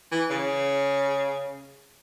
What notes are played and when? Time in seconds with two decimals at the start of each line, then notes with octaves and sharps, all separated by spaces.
0.12 E3
0.30 C#3